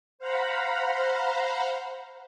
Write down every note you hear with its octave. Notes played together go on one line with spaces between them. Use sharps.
C5 F5 F#5 A#5 B5